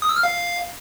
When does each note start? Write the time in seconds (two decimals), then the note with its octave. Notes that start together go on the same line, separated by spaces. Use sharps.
0.02 D#6
0.09 E6
0.16 F6
0.23 F5